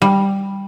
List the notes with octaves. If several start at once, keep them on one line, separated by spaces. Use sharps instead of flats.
G3